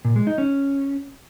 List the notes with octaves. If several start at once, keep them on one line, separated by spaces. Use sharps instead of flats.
A#2
G#3
D#4
C#4